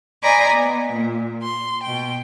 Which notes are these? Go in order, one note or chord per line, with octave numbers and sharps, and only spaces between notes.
C5 D5 D#5 G#5 A#5 B5
B3
A#2
C6
B2 G5